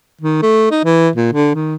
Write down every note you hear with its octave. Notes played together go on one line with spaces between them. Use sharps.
D#3
A3
D#4
E3
A#2
D3
D#3